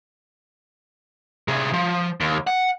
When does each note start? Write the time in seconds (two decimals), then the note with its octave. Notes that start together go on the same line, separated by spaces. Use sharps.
1.48 C3 G#4
1.74 F3
2.20 D#2
2.47 F#5